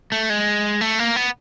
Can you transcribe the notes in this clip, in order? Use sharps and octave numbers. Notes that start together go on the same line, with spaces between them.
A3
G#3
A3
A#3
B3